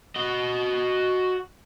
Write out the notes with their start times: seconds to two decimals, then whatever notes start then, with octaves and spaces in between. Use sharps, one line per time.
0.16 F#4 D#5